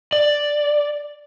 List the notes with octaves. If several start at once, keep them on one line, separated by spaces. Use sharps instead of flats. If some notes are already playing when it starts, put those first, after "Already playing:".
D5